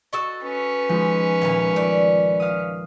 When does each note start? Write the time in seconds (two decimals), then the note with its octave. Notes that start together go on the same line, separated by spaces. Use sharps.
0.13 F#4 A4 D#5 C#6 E6
0.42 C#4 B4
0.89 F3 G#3 D#4
1.42 D#1 A#2 C#3 F5
1.76 A3 D5
2.40 F5 D#6